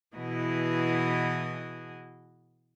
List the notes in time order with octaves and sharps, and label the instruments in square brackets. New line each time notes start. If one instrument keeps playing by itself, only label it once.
[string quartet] B2 E3 E4 F#4 G#4 D#5